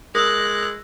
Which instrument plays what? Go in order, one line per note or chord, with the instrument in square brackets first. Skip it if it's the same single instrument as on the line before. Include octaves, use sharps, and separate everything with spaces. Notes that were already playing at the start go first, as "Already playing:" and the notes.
[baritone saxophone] G#3 [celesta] A#4 D#6 [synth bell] E6 A#6 [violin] F#6